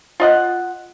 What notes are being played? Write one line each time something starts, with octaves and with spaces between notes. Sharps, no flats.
F4 D#5 F#5